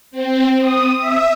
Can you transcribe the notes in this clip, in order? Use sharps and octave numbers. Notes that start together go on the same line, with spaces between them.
C4
D#6
E5